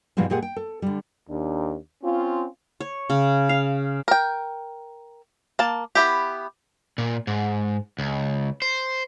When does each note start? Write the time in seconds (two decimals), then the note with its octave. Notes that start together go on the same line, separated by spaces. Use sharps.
0.17 G#2 B2 E3 F3 G3 G#3
0.30 A#2 G#3 G4 G#4 F#5
0.42 G5
0.56 A4
0.82 D3 G3
1.30 D#2 D4
2.04 C4 C#4 F4
2.80 C#5
3.10 C#3
3.49 F5
4.08 A#4 G5
5.59 A#3 A5
5.95 B3 E4 G4
6.98 A#2
7.27 G#2
7.99 C#2
8.62 C5